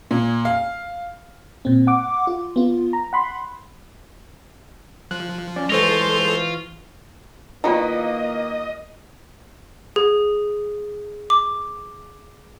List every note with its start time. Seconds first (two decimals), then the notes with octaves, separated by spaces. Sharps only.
0.11 A#2
0.45 F5
1.65 A#2 C4
1.87 F#5 D6
2.27 F4
2.56 B3 F4
2.93 A#5
3.13 F#5 B5 C6
5.11 F3 F#6
5.56 C#4 D5
5.70 E3 G#3 F4 A4 C5 C#6 A#6
7.64 D#3 A#3 B3 E4 F4 D5 D#5
9.96 G#4
11.30 D6